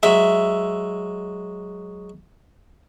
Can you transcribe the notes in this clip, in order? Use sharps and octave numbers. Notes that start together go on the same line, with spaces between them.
F#3 G#3 E5